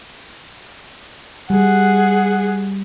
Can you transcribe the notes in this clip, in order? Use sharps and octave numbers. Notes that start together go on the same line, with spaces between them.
G3 G#4 F#5